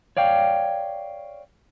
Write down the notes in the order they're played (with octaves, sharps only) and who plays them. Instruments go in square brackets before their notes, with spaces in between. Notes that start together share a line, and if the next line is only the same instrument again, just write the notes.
[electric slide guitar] C#5 D5 F5 G5